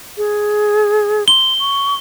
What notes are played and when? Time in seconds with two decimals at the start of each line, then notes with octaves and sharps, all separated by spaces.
0.18 G#4
1.28 C6 G7
1.59 C#6